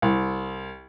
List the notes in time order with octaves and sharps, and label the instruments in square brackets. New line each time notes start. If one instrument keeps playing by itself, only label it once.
[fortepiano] C2